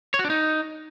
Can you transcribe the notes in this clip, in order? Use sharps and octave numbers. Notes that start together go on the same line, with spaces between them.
C#5
F#4
D4
D#4